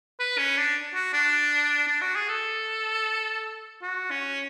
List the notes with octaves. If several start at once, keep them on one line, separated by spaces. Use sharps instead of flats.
B4
C#4
D4
F#4
D4
D4
F#4
G#4
A4
F#4
C#4